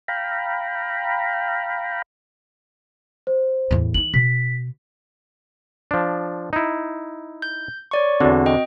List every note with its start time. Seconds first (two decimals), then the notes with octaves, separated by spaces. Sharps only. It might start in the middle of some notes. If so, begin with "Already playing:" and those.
0.08 F5 G5 A#5 B5
3.27 C5
3.71 E2 A2
3.94 E3 D#4 F#7
4.14 B2 B6
5.91 F3 D4
6.53 D#4 E4
7.42 G6
7.91 C#5 D5 C#6
8.20 E2 D3 C4 F#4
8.46 D#5 G5